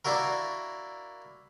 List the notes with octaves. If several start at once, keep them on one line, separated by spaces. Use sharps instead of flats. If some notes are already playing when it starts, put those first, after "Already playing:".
A#3 D4 E4 F#4 A#4